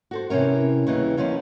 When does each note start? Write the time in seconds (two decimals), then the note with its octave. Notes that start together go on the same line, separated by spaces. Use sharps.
0.11 F#4 A4 C5
0.30 C3 E3 C#4 A#4
0.87 D#2 C#3 E3 G3
1.17 D#3 F3 B3 C#4 F4